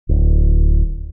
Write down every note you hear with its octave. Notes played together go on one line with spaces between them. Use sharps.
D1